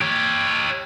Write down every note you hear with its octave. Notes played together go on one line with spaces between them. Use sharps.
G4 C#5